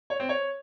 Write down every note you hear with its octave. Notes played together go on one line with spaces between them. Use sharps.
C#5
C4
C#5